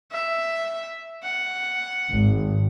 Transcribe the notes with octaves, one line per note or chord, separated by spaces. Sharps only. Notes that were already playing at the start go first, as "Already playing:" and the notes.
E5
F#5
G#1